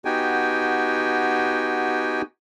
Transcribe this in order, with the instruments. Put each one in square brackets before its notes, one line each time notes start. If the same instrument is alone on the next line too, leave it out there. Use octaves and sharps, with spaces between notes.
[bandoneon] B3 D#4 F#4 G4 G5 G#5